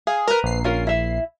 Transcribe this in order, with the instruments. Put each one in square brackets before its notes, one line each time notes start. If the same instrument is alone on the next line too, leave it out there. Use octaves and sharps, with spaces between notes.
[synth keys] G#4 [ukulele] F5
[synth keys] A#4 [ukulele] B4 A#5
[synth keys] A#1 C7
[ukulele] C#4 F4 A#4
E4 E5